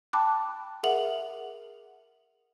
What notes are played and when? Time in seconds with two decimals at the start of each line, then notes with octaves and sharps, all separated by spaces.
0.13 G5 A5 B5 D6 F#6
0.83 G#4 A#4 E5 F#5 F7 F#7